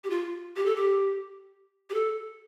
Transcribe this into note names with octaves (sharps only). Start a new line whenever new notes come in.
G4
F4
G4
A4
G4
G4
A4